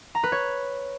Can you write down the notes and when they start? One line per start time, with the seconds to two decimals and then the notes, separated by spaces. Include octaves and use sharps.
0.15 A#5
0.23 B4
0.32 C#5